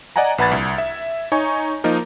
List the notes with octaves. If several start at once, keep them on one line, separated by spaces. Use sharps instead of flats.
D5 D#5 F#5 G#5 A#5
A#1 B4 F#5 B5 G#6 A6
C2
E5
D#4 C#5 G#5 C#6
F3 A#3 D#4 A#4